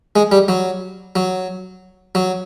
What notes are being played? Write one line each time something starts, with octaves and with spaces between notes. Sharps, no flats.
G#3
G3
F#3
F#3
F#3